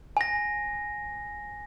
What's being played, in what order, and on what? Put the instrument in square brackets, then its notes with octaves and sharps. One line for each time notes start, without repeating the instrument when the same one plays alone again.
[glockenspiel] G#5 A#6